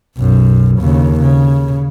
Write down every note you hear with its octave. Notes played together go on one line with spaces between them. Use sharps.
B1 F#2
D#2 C#3
C#3